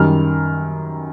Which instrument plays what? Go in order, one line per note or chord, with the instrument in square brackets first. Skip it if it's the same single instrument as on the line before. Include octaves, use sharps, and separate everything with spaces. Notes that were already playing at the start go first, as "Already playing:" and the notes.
Already playing: [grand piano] F#2 D#3 G3 F6